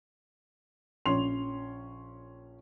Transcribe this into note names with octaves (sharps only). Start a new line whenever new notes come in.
A#1 C#4 C6 F7